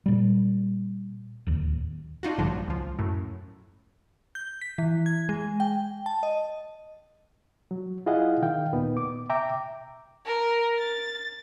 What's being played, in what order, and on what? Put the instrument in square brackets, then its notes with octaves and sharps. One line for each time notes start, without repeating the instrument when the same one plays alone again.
[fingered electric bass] A#2 G3
D1 D#2
[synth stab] D4 D#4 F4 F#4
A#1 G2 D3 F3 F#3
C#2 F3
F#2 A2
[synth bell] G6
B6
E3
G#6
G#3
G5
A5
D#5
[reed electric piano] F#3
E4 F4 G#4 D#5 F5 F#5
D#3 F5 G5
D#2 A#2 B3 D#4
D6
E5 G5 A#5 D6
[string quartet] A#4
A6